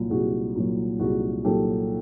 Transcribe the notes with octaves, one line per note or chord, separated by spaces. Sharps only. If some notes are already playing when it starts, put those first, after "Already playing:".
Already playing: C2 A#2 F#3
C2 F#4 G#4
A#2 F#3
C2 F#4 G#4
A#2 F#3 G4 A4